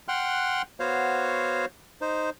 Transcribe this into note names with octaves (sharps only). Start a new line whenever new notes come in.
F#5 G5 C6 F6 F#6
B3 F#4 C5 C#5 F5
D#4 C5